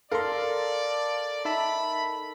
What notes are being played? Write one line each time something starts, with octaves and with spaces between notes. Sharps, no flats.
A4 A#4 D5 F5 C6
D#4 E5 A5 B5